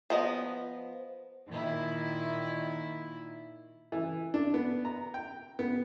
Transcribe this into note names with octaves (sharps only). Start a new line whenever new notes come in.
F3 B3 D#5
A#2 D#3 E4
E3
D4
B3
A#5
G5
B3